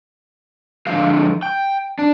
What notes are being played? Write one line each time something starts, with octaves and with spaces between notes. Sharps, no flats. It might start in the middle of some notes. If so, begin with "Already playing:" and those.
D3 F3 G#3 F5
G5
D4